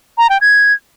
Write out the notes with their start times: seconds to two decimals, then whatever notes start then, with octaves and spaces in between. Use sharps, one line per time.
0.18 A#5
0.30 G5
0.41 G#6